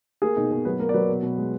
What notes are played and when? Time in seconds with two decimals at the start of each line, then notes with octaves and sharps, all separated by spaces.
0.22 A#3 G#4
0.36 B2 D#4
0.51 B2
0.65 F#3 B4
0.79 A#3 A#4
0.89 D5
0.94 F#3 B4
1.09 B2
1.22 B2
1.38 G#3